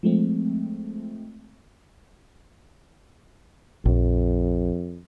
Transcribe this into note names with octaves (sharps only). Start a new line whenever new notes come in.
F3 G#3 A3 C4
A#1 F2